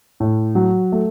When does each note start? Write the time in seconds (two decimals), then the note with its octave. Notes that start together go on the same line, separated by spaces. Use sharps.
0.20 A2
0.55 F#3
0.92 A3